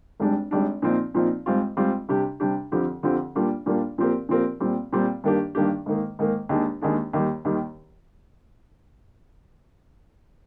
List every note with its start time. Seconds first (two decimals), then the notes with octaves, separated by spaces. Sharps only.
0.20 G#1 G#2 G3 D4
0.51 G#1 G#2 G3 D4
0.82 A#2 F3 C4 D#4
1.15 A#2 F3 C4 D#4
1.46 G#2 G3 C4 F4
1.77 G#2 G3 C4 F4
2.09 C3 G3 D4 G4
2.40 C3 G3 D4 G4
2.72 F2 D3 F3 C4 G4
3.03 F2 D3 F3 C4 G4
3.35 A#2 G3 A#3 D4 F4
3.66 A#2 G3 A#3 D4 F4
3.98 A#2 F3 C4 G4 A#4
4.29 A#2 F3 C4 G4 A#4
4.60 A#2 G3 C4
4.93 A#2 G3 C4
5.24 G2 D#3 A#3 D4 G4
5.55 G2 D#3 A#3 D4 G4
5.86 G#2 D#3 A#3
6.19 G#2 D#3 A#3
6.49 D#2 D#3 G#3 D4
6.81 D#2 D#3 G#3 D4
7.13 D#2 D#3 G3
7.45 D#2 D#3 G3